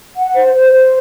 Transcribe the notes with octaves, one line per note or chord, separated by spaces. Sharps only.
F#5
C5
C5
C5